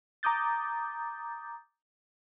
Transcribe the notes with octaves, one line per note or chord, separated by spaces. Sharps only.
A#5 D6 D#6 G6 A6